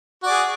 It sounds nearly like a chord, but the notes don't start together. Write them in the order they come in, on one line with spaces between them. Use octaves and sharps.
F#4 D5 G#4